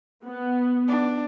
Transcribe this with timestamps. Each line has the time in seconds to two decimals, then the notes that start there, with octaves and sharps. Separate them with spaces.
0.25 B3
0.88 D4